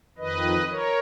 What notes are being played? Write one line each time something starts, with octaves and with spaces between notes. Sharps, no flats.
F2 D#3 B4 D#5
A#4 C#5